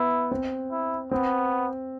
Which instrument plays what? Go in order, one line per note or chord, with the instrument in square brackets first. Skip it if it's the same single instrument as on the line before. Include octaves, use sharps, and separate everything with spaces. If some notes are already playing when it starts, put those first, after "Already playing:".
Already playing: [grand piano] B3 [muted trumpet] E4
[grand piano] C4
[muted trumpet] E4
[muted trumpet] B3 [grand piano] C4